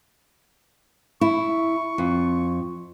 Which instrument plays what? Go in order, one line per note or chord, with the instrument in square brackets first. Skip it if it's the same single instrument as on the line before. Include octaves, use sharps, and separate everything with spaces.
[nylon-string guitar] E4 [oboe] C#6
[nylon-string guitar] F2